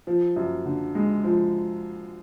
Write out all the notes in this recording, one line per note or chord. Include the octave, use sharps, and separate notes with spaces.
F3
F#2
D3
G#3
F3